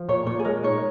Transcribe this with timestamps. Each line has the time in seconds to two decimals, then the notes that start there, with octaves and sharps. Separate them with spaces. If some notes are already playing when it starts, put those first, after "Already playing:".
Already playing: F3
0.09 A#2 C#5
0.27 A#2 C#5
0.39 G#4
0.45 G#3 A#4
0.63 D#4 C#5